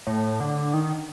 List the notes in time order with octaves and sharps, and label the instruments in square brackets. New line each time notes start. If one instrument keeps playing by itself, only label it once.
[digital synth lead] A2
D3
D#3